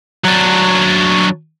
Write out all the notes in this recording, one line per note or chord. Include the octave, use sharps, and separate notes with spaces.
F#3 D4